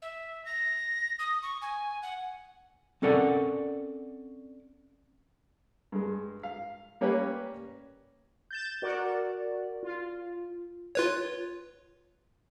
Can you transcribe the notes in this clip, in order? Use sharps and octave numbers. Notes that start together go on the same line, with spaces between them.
E5
A#6
D#6
C#6
G#5
F#5
C4 C#4 A4 A#4 D5 F#5
G2 G#3
F5
G3 A#3 C#4 G4 B4 C#5
G6 A6 E7
F#4 A#4 D5
F4
F4 B4 C#5